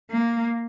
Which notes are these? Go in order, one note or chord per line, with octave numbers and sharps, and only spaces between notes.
A#3